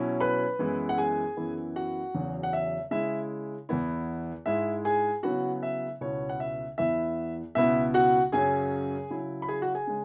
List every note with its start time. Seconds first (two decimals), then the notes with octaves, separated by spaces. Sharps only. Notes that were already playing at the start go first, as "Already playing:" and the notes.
Already playing: B2 F#3 C#4 E4
0.20 B4 B5
0.59 F#2 E3 G#3 B3 E4
0.89 F#5
0.98 G#4 G#5
1.37 F#2 E3 B3 E4
1.76 F#4 F#5
2.15 E2 C#3 F#3
2.43 F#5
2.53 E5
2.91 C#3 G#3 E4 E5
3.69 E2 E3 B3 E4
4.46 G#2 G#3 E4 E5
4.85 G#4 G#5
5.23 C#3 F#3 B3 E4 F#4 F#5
5.63 E5
6.01 C#2 B2 B3 E4 C#5
6.29 F#5
6.40 E5
6.78 E2 E3 B3 E4 E5
7.55 C#2 B2 B3 E4 E5
7.94 F#4 F#5
8.32 F#2 C#3 F#3 C#4 G#4 G#5
9.10 C#3 F#3 E4
9.42 B5
9.48 G#4 G#5
9.62 F#4 F#5
9.75 G#4 G#5
9.87 C#3 G#3